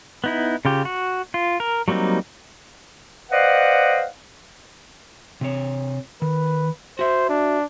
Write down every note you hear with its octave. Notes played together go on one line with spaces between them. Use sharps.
B3 D#4 E4
C#3 F4 G4
F#4
F4
A#4
F#3 G3 A#3 C4 D#4
B4 C5 D5 D#5 F5 F#5
C3 C4 C#5
D#3 B4
F#4 C5 E5
D4